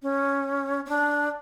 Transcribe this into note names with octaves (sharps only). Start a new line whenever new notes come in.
C#4
C#4
D4